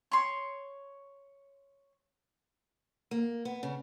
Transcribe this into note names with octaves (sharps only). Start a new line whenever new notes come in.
C#5 C6
A#3
B3
C#3